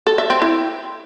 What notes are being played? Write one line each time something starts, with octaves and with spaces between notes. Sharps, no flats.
A4
E5
C4
E4